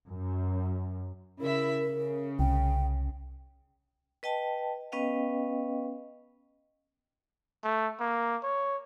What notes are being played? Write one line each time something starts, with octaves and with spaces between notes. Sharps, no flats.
F#2
C#3 E4 A#4 E5
C#3
C2 G5
B4 D#5 G5 A5
B3 C#4 B4 D#5 F5 G5
A3
A#3
C#5